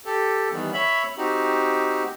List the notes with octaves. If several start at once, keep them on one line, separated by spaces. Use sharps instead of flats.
G4 A4
D#3 E3 G3 B3
C#5 E5 B5
C4 D#4 F#4 G4